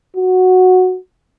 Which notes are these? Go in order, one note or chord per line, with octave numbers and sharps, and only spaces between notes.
F#4